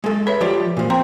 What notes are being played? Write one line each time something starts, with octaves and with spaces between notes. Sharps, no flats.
G#3 A4
B4 C#5 E5 B5
F3 G4 D5
A#2 F3
C4 G5 A#5 C6